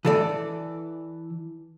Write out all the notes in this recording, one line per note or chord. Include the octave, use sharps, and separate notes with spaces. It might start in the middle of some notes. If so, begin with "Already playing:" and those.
E3 A4 D5